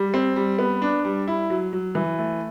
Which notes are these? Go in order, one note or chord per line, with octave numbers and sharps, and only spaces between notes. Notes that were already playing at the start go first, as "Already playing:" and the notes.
Already playing: G3
C4
G3
B3
D4
G3
E4
F#3
F#3
E3
A3